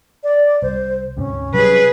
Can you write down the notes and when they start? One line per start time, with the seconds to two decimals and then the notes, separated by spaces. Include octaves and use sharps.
0.23 D5
0.62 C2 C5
1.17 D2 G#2 C3 C#4
1.54 C3 F#3 G3 G#4 B4